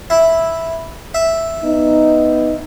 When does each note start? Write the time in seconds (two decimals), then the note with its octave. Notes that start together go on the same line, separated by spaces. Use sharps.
0.10 E4
1.14 E5
1.64 B3 D#4